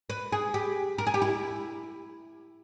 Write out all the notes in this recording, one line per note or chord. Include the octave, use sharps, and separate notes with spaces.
B4
G#4
G4
A#4
G#4
G4
E4